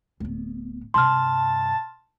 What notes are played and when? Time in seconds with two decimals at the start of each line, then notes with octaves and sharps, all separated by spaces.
0.20 D1 B3
0.94 G2 C3 A5 C6 F6